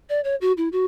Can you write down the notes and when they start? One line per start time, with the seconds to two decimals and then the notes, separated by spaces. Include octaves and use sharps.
0.09 D5
0.24 C#5
0.41 F#4
0.57 E4
0.72 F#4